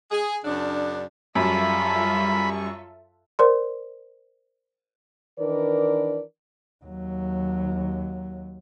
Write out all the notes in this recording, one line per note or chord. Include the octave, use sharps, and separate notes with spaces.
G#4
F#2 C#3 D4
F#2 G3 F4 A4 E5 B5 C#6
A#4 C5 D5 C6
D#3 E3 D4 A#4 B4 D5
D#2 F#3